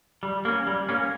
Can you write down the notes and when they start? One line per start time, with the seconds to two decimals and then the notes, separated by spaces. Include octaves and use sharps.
0.23 G3
0.45 A#3 C#4
0.67 G3
0.89 A#3 C#4